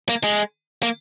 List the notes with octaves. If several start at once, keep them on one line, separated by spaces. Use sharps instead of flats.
A#3
G#3
A#3